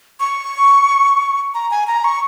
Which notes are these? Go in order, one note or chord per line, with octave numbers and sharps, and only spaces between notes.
C#6
A#5
G#5
A#5
C#6